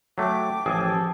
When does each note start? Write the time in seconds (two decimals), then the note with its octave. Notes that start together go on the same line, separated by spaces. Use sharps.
0.18 F#3 A3 G5 D6
0.66 A1 F3 G#4 A4 G#5